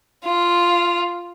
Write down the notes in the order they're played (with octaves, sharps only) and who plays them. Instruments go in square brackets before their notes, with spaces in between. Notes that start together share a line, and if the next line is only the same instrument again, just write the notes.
[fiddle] F4